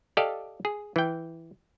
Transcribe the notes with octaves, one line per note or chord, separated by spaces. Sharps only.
G4 A4 D5 D#5 F5
G#4
E3 G5